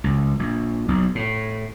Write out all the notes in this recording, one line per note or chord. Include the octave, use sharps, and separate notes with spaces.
C#2
A#1
B1
A2